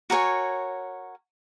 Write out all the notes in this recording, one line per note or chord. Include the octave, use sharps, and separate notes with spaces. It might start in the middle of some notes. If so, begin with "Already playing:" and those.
F#4 A#4 C#5 G#5